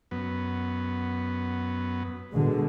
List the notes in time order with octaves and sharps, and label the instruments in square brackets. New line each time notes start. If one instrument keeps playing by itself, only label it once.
[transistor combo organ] F#2 B3
[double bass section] B2 D3 G#3